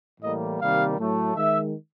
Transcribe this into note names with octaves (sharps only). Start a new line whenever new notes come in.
A2 E3 G3 A#3 D#5
C3 D#3 G3 A#3 F5
A2 F#3 A3
D#3 G#3 E5